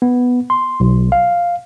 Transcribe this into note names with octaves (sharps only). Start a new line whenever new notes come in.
B3
C6
B1
F5